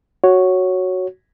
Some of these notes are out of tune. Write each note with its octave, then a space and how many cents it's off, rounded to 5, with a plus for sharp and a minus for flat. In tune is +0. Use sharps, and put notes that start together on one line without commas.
F#4 +0 C#5 +0